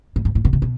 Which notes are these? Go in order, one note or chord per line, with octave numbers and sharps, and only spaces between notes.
A2
G#2
A2
B2
C3
B2